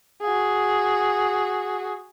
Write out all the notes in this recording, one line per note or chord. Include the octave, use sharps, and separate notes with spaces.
F#4 G#4